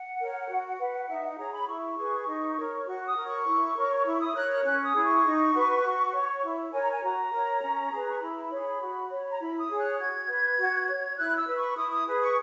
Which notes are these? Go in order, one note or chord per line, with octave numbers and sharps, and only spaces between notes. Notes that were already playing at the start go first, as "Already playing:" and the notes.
Already playing: F#5
A#4 C#5
F#4
B4
D#4 E5
F#5
G#4 C#5 A#5
B5
E4 C#6
G#4 B4
D#4
A#4 C#5
F#4 C#6
D#6
A#4 C#5
C#6
E4
A#4 C#5
E4 C#6
D#6
A#4 C#5 F#6
F#6
C#4 F#6
D#6
E4 G#4
C#6
D#4
F#4 B4
F#4
C#5
E4
A#4 C#5 G#5
A#5
G#5
F#4 A#5
A#4 C#5
C#4
G#4 B4
C#6
E4 B5
G#4 C#5
F#4
C#5
A#5
E4 B5
D#6
G#4 C#5
F#6
F#4 G#6
B4
F#4
C#5
E4 F#6
E6
B4
C#6
E4 D#6
D#6
G#4 B4
C#6